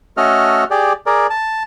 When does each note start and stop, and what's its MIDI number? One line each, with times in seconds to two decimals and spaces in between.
0.17 0.64 57
0.17 0.64 61
0.17 0.64 66
0.17 0.64 69
0.17 0.64 75
0.17 0.64 89
0.71 0.93 67
0.71 0.93 68
0.71 0.93 74
1.06 1.27 68
1.06 1.27 70
1.06 1.27 74
1.30 1.63 81